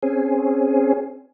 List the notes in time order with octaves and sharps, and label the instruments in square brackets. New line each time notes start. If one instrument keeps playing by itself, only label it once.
[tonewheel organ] C4 C#4 G#4